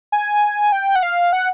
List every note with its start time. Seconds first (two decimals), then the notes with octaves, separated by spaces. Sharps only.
0.12 G#5
0.72 G5
0.96 F#5
1.03 F5
1.33 F#5